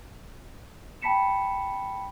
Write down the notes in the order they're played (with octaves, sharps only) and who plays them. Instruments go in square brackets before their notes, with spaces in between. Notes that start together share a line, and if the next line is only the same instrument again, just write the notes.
[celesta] G5 A5 B5 B6 C#7 E7